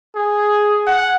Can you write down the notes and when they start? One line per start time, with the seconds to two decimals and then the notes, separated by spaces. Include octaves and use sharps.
0.16 G#4
0.87 F#5